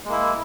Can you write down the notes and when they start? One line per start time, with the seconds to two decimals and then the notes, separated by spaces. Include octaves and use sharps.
0.05 G#3
0.09 A#3
0.12 E4